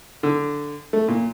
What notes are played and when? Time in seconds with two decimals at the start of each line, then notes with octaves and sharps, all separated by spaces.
0.23 D3
0.93 A3
1.08 A#2